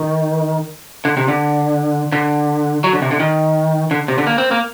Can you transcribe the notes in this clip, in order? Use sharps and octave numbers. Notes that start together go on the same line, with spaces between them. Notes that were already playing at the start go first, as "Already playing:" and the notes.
Already playing: D#3
D3
C3
D3
D3
F#3
D3
C3
D3
D#3
D3
C3
D3
A#3
C4
A#3